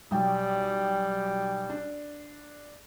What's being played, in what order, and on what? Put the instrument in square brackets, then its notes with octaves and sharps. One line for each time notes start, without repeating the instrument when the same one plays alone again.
[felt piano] B1 G5 [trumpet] G3
[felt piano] D4